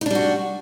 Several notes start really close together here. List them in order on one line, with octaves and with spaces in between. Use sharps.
D#4 D4 G3 F#4